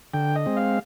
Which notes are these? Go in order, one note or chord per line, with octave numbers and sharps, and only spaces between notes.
D3 G5
D#5
G#3 C4
F5